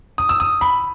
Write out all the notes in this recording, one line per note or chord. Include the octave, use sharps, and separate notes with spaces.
D#6
E6
D#6
B5